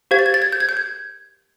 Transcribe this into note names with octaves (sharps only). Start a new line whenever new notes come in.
G4 C5 F5 G#6
A6
G#6
A6
G#6
G6
G#6
G6
G#6